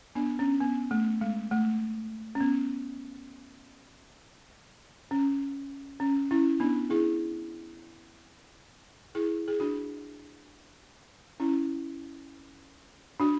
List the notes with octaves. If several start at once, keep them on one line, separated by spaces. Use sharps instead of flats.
B3 D4
C#4
B3
A3
G#3
A3
C#4
B3
C#4
C#4
C#4 E4
B3 D4
E4 G#4
E4 G#4
G#4
D4 F#4
C#4 E4
D4 F#4